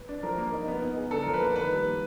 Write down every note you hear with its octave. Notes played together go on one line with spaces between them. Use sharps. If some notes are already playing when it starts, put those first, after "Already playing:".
Already playing: B4
D4
F3 A#4
A#3
D#4
B3
D#4
G#4
D3 A4
F3 A#4
B4
A#3
D#3 B4
G3
A#3